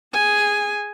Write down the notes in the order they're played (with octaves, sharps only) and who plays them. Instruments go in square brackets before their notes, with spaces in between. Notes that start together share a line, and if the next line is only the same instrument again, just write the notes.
[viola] G#4 G#5